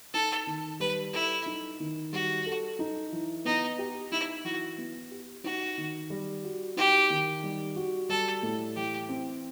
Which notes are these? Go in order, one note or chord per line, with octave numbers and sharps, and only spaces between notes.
D#4 A4
D#3
G3 B4
E4 A4
D#4
D#3
G3 F#4
A4
D#4
E3
B3 D#4
G4
D#4 E4
E3 F#4
B3
G4
D#4 F#4
D#3
G3
F#4
D#4 G4
D#3
G3
F#4
G3 A4
A2
E3 G4
C4